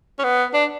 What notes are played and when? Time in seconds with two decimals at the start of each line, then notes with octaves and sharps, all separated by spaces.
0.19 C#4
0.24 B3
0.54 D4